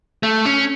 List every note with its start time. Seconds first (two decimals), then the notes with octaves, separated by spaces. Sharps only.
0.23 A3
0.45 C#4